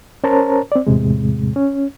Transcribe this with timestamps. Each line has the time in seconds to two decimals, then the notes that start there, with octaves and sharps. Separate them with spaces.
0.24 C#4 A#4 C5 C#5 A5 A#5
0.72 C4 D5
0.87 E2 A2 C3 G#3
1.56 C#4